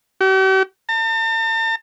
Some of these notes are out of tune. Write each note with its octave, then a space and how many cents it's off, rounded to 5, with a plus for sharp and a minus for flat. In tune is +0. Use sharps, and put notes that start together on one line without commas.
G4 -45
A5 +45